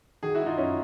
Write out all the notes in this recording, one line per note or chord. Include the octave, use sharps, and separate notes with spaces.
D#3 F#4 G#4
E4 F#4
G#3
D#4 F4
F#2 C#4 D#4